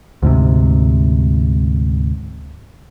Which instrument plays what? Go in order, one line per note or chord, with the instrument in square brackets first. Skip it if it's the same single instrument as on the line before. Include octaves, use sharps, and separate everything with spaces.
[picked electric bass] D2 G#2 C3